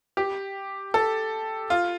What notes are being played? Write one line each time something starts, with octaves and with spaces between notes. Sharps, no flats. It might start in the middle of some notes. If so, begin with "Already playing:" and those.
G4
A4
F4